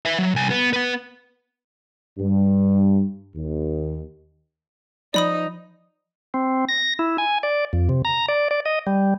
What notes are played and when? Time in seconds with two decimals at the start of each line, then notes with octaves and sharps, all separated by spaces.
0.05 B4 E5
0.19 F#3
0.35 C2 G#5
0.50 B3
0.73 B3 B4
2.19 G2
3.36 D#2
5.14 F3 D#4 D5 B5 D#6
6.34 C4
6.69 A#6
6.99 E4
7.18 G#5
7.43 D5
7.73 F2
7.89 C3
8.05 A#5
8.29 D5
8.51 D5
8.66 D#5
8.87 G3